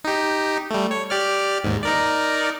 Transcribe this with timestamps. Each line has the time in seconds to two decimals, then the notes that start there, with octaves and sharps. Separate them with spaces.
0.04 D#4 G4
0.71 G3 A3
0.91 C#5
1.10 G4 D5 F6
1.64 D#2 G#2
1.83 D#4 A#4 D5